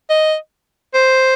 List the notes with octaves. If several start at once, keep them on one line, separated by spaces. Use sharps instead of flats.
D#5
C5